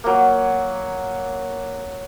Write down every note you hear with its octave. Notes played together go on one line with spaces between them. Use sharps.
F#3 A#3